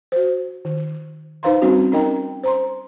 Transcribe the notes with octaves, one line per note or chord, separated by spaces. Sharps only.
F#4 C5
D#3
D#4 B4 C5 F5 A#5 C6
G3 C4 C#4 D#4 F#4
C#4 D#4 A#4 D#5 G5 A#5
C5 A#5 C6